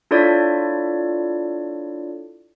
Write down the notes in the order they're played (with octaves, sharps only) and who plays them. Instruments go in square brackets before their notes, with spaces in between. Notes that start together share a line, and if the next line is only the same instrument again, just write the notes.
[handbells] D4 E4 F4 A4 C#5 D5